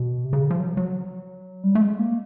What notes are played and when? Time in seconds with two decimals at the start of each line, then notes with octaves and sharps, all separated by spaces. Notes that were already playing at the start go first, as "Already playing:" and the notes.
Already playing: B2
0.25 C3
0.33 C#3
0.42 D3
0.50 F3
0.59 F#3
0.77 F#3
1.64 G3
1.75 A3
1.81 G#3
1.99 A#3